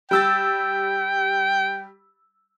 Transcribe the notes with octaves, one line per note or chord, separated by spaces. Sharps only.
G3 G5 E6 A6